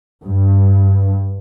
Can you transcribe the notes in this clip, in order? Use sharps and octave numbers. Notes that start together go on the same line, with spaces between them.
G2